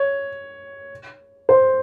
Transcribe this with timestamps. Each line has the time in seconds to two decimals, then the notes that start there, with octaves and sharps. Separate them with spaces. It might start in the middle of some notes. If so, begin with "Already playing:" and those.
Already playing: C#5
1.49 C5